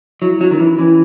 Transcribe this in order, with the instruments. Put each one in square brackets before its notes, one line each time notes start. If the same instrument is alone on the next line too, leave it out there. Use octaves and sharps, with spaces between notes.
[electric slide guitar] F#3 [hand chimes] E4
[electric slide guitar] F#3 [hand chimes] C#4
[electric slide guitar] D#3
[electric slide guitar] E3 [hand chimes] E4
[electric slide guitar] E3 [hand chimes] C#4